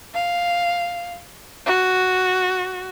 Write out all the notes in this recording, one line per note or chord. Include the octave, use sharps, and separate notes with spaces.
F5
F#4